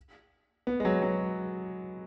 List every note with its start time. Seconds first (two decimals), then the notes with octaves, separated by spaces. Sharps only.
0.67 B3
0.80 G#3
0.85 F#3
1.02 F#3